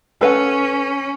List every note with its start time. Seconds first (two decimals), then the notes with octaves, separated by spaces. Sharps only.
0.21 C#4 A4 B4 F#5